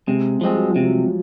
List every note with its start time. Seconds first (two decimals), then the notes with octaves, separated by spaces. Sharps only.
0.07 C3 G#3
0.41 F3 G3 G#3 C4
0.55 F#3
0.70 F3
0.76 C3
0.84 F#3